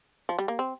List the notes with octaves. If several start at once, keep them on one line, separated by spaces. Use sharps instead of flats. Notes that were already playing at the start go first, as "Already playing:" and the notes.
F3
G3
A#3
C4